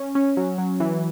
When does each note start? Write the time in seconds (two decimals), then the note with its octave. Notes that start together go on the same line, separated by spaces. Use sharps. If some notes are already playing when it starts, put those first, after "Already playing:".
Already playing: C#4
0.15 C#4
0.37 F#3
0.58 F#3
0.80 E3